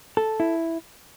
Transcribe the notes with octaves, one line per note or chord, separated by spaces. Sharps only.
A4
E4